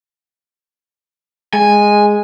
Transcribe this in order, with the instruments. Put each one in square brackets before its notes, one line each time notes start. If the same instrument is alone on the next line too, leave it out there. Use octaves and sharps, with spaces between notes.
[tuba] G#3 [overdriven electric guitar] G#5